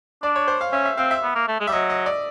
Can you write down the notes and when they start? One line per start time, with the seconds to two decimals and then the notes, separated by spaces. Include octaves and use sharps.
0.23 D4 D5
0.36 C#5
0.48 C5
0.61 F5
0.72 C#4 E5
0.86 E5
0.97 C4 F5
1.11 E5
1.23 B3
1.35 A#3
1.48 A3
1.60 G#3
1.67 G3 E5
1.72 F#3 D#5
1.90 D#5
2.06 D5